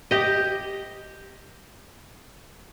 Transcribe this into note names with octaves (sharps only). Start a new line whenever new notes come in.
G4 D#5